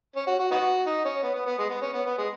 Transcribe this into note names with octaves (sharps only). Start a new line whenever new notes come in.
C#4
F#4
F#4
B3 D#4 F#4
D#4
C#4
B3
B3
B3
G#3
B3
C#4
B3
B3
G#3